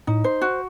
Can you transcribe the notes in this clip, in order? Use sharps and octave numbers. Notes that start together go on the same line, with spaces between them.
A2 D#4
C5
F#4